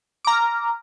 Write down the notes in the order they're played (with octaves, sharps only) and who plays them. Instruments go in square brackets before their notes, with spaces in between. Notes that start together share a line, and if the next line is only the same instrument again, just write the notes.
[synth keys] D6
A#5
F6